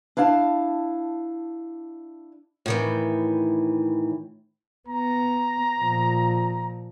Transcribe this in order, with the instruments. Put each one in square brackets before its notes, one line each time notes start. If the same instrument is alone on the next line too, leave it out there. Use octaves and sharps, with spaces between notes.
[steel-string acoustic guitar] D4 E4 F5 A5
A2 D#3 E3
[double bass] B3 [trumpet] A#5
[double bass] A#2 F3